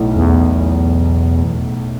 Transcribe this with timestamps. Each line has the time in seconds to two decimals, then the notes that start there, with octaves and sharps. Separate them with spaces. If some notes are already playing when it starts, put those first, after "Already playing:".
Already playing: B1 A2 A3
0.16 E2